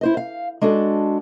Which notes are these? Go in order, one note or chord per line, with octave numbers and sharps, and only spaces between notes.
E4 C5 D#5
F5
G#3 D4 F#4 A4